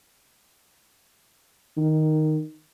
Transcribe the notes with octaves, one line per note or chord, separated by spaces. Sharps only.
D#3